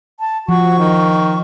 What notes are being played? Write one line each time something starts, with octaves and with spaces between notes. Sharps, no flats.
A5
F3 F#4 C#6
D#3